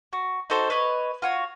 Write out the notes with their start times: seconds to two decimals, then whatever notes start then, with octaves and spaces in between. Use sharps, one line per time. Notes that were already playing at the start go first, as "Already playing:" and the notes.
0.13 F#4
0.50 D#4 F#4 A4 C5
0.70 B4 C#5 D#5
1.22 F4 F#4 C#5